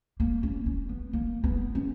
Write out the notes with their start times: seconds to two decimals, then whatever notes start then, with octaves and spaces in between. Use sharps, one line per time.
0.20 A#3
0.43 C#4
0.66 C#4
0.89 B3
1.13 A#3
1.44 B3
1.75 C#4